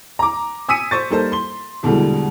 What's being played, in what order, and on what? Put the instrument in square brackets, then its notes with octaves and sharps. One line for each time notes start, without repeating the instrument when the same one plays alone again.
[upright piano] A#5 D6
G#5 D#6 E6 B6 C#7 D#7
C5 C#6 A6
G3 A#3 D#4 A4 A#4 C5
C6 G7
E2 B2 D3 E3 G3 G#3